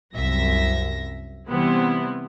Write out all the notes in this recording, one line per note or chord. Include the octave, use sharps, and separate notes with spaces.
C2 F#2 E5 A#6
C3 E3 G3 B3 C4 E4